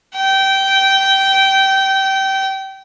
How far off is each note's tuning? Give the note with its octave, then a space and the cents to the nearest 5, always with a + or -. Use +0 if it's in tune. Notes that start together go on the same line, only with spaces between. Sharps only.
G5 -20